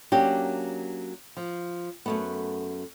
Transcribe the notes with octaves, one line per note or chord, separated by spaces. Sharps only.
F#3 A#3 C#4 D4 G4
F3
F#2 A3 B3